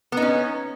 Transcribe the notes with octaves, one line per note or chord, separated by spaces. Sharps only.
B3 C#4 D#4